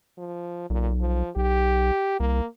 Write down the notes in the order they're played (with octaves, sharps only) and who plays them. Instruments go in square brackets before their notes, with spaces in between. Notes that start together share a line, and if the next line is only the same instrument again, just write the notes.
[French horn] F3
[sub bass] B1 [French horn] A#2
[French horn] F3
[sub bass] B1 [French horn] G4
[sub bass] C2 [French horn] A#3